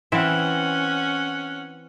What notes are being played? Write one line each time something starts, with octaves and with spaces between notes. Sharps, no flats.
E3 C4 C#4 E5 F#5